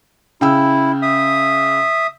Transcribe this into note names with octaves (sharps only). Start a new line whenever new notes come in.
C#3 E4 G5 E6
E5 D#6